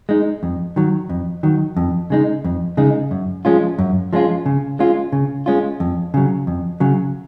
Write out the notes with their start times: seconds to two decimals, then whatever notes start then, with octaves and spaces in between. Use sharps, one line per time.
0.09 G#3 D#4
0.43 F2
0.76 D#3 F#3
1.09 F2
1.43 D#3 F#3
1.77 F2
2.10 C#3 G#3 D#4
2.44 F2
2.77 C#3 G#3 D#4
3.11 F#2
3.45 F3 G#3 C#4 F4
3.79 F#2
4.13 F3 G#3 C#4 F4
4.46 C#3
4.79 G#3 C#4 F4
5.12 C#3
5.46 G#3 C#4 F4
5.80 F2
6.14 C#3 F#3
6.47 F2
6.80 C#3 F#3